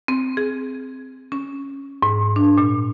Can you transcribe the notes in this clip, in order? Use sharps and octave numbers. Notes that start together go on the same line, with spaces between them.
C4
G#4
C#4
G#2
D4
A#2